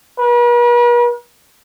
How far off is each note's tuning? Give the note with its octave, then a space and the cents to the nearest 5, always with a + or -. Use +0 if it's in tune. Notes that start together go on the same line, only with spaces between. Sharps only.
B4 -45